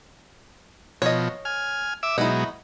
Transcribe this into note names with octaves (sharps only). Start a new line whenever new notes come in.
B2 F3 C#5 D#5
G#5 F6
E5 D6 E6
B2 F#3 G#3 D#4 E4